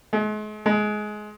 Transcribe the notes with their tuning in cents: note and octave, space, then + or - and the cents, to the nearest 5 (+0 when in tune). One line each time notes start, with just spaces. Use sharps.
G#3 +40
G#3 +20